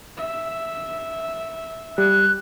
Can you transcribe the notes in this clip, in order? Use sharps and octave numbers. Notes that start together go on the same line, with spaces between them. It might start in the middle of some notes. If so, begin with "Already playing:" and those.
E5
G3 F#6